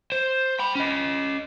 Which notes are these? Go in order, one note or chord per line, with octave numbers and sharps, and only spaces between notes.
C5
G5 B5
C#4 D#5